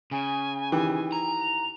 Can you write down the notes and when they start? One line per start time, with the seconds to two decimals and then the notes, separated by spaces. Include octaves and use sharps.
0.11 C#3 G#5
0.72 D#3 E3 G4
1.12 A#5
1.40 F7